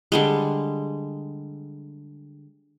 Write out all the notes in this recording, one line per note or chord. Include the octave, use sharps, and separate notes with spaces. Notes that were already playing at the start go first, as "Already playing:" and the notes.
D3 G3 G#3